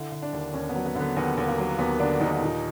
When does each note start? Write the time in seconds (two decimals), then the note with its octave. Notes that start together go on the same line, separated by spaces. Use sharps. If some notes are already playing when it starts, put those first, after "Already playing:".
Already playing: D3 E4
0.12 D3
0.22 D4
0.33 D#2
0.54 D#2 C#4
0.69 B3
0.75 F#3
0.86 B3
0.95 D3
1.01 B3
1.16 D#2 B3
1.37 D#2
1.48 A#3
1.58 F#3
1.78 D#2 B3
2.00 D3 D4
2.20 D#2 D#4
2.33 D4
2.41 A#2 D#4